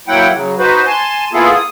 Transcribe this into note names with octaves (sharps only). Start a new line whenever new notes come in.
F#3 A#3 E4 F#5 G5
C#3 F#3
D#4 F#4 B4 C5
G#5 A5 C6
A#3 B3 E4 F4 G#4 A4
D#6